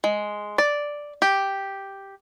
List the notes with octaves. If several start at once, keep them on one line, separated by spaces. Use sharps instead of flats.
G#3
D5
G4